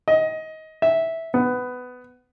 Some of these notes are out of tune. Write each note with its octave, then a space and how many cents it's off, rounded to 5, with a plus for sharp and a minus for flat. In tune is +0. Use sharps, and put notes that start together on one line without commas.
D#5 +20
E5 -10
B3 +15